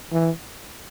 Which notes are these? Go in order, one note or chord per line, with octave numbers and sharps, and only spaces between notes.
E3